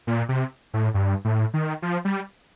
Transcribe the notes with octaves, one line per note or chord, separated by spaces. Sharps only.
A#2
C3
A2
G2
A2
D#3
F3
G3